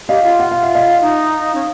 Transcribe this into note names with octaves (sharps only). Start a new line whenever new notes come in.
G4 D#5 F5
F4
F#5
F5
E5
D#5 F5
D#4
C#4